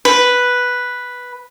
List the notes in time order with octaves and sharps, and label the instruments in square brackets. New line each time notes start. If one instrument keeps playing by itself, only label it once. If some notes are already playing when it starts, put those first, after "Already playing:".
[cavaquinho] B4